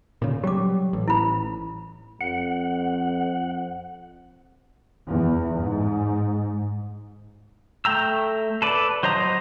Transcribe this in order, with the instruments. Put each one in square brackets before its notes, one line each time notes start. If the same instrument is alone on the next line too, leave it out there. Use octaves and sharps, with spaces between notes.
[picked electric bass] A#2 C#3
[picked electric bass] F#3 G3 [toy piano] G4 D6
[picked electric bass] A1
[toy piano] E4 B5
[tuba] F2 [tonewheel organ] F#5
[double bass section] E2
G#2
[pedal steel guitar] A3 G5 A#5 E6
A4 B4 D5
F#3 C5 D#5 A#5 D#6